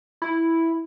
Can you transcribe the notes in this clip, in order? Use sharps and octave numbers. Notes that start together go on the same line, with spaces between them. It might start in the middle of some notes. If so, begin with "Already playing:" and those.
E4